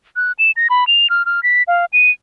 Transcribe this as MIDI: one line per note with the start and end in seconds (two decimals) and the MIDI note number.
0.16 0.32 90
0.39 0.51 100
0.56 0.68 94
0.70 0.87 83
0.87 1.09 101
1.10 1.25 89
1.26 1.43 89
1.43 1.63 95
1.68 1.85 77
1.93 2.11 99